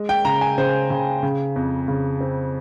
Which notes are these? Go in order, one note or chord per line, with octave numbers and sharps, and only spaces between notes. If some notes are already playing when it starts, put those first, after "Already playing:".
Already playing: G#3
G5
C#3 A#5
G#5
C#3 C5
C#3
C#3
F2
C#3
C4